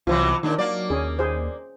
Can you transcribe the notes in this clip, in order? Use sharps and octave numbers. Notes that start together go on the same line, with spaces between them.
C2 B2 E3 F#3 F4 C5
D#2 A#2 D#3 D4
F#3 A#3 D5
D#2 C#4 G#4
G#4 C5